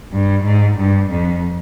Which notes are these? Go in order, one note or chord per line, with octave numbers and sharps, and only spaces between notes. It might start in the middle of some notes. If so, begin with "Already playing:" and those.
G2
G#2
G2
F2